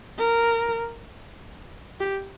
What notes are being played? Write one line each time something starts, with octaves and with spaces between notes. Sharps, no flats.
A#4
G4